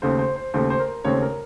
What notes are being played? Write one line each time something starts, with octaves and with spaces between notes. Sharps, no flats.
D#2 C#3 A3 C5
C5
C5
D#2 C#3 A3 C5
C5
A#4
D#2 C#3 A3 C4 C#5
A#4